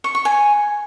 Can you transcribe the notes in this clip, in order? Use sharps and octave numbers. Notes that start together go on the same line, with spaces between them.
C#6
C#6
G#5